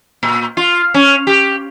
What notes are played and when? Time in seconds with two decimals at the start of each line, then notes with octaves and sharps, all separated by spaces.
0.23 A#2
0.57 F4
0.94 C#4
1.27 G4